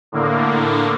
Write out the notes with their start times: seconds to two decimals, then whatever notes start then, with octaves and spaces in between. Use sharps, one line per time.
0.12 A2 D3 A#3